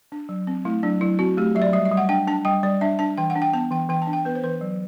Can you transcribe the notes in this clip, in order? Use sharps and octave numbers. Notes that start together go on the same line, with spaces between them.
D4
F#3
C4
A3 E4
F#3 D4
F#3 E4
C4 F#4
A3 G4
F#3 E5
D5
G3 E5
E5
G3
F#5
D4 G5
D4 A5
G3 G5
G3 D5
D4 E5
D4 A5
E3 G5
F#5
D4
G5
B3 A5
E3 G5
E3 G5
A5
D4
G5
B3 B4
C5
E3 B4
F#3